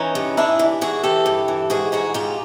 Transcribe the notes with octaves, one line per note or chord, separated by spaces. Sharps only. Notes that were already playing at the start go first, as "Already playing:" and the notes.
Already playing: E3 C#4 D#4
G2
E3 D4 E4
E3
E3 F#4 G#4
E3 G4 A4
G2
E3
G#2 F#4 G#4
G#2 F#4 G#4
G#2 F4 G4